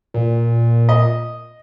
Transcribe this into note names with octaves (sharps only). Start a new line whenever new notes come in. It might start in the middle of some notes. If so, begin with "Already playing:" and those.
A#2
D#5